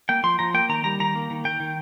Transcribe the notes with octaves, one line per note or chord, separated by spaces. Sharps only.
A#3 G5
F3 C6
F3 A#5
A#3 G5
D#3 A#5
G3 A#5
D#3 A#5
A#3
D#3
D#3 G5
D#3